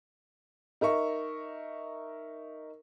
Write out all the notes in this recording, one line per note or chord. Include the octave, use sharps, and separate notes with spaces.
D#4 A#4 E5 C#6